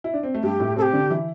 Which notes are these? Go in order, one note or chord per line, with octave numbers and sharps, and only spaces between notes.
E4
D4
C4
A3
G2 G3 G4
A2 A3
C3 C4 A4
G4
D3 D4
E3 E4